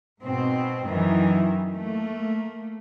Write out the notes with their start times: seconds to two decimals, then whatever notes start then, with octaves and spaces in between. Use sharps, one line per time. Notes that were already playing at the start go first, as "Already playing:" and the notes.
0.22 G#2 B2 C4
0.87 F#2 D#3 E3
1.74 A3 A#3